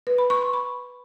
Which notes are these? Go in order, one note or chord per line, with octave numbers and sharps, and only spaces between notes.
B4
B5
C#6
C6
B5